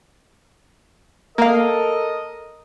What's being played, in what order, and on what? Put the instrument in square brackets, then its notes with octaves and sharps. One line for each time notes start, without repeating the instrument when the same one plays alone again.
[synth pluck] A#3 F5 [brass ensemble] A4 A#4 D#5